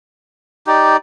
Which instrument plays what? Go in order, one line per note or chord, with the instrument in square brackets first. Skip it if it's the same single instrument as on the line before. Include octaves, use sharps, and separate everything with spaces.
[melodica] D#4 G4 D5